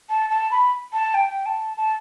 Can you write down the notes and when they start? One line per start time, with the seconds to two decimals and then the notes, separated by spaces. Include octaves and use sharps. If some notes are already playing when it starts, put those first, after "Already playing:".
0.10 A5
0.30 A5
0.51 B5
0.93 A5
1.14 G5
1.46 A5
1.77 A5